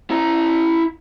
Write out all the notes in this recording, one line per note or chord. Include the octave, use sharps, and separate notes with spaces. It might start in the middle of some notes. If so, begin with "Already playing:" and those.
E4 A#5